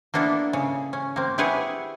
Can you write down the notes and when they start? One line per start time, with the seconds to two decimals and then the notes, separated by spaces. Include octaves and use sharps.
0.14 A#3 B3 D4 E4 A4
0.53 C#3
0.93 C#4
1.16 A#3 C4
1.38 E4 G4 G#4 B4 C#5 F#5